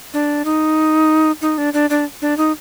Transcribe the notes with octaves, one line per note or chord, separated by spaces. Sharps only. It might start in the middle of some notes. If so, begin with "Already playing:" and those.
D4
D#4
D#4
D4
D4
D4
D4
D#4